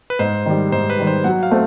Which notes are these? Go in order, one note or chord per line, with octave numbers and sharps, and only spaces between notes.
B4
G#2 C5
D#3 G3
G#2 C5
B4
D#3 G3
C5
F#3 F#5
F5
A3 C4